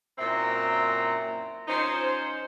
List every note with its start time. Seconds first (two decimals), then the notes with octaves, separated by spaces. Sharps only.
0.19 F#2 A#2 C4 E4 A#5
1.68 F3 C#4 D#4 C5